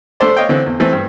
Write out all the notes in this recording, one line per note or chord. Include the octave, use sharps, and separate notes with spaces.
A3 D4 A4 C5 D5
C#5 D#5 F5 G5
D3 E3 C4
E2
E3 A3 C4
G2